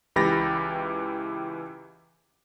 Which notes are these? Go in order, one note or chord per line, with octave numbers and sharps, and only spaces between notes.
C#2 E3 G4 B5 A6 A#6